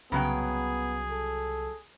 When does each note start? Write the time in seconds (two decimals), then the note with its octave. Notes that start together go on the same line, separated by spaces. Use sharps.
0.12 C2 C#3 F#3 B3 G#4 G5
1.11 A4